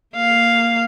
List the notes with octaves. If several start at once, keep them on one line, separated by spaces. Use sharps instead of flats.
A#3 F5